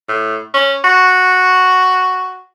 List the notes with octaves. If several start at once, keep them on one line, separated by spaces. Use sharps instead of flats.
A2
C#4
F#4